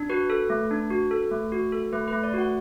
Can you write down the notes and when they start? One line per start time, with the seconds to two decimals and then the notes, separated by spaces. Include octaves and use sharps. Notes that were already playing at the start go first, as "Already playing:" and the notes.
Already playing: D4
0.10 F#4 B4
0.30 A4
0.50 A3
0.71 D4
0.91 F#4
1.11 A4
1.31 A3
1.52 F#4
1.72 A4
1.92 A3 B4
2.08 B4
2.13 A3
2.23 D5
2.33 F#4 F#5